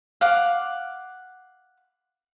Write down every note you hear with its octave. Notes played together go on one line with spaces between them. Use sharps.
F5 F#5 D6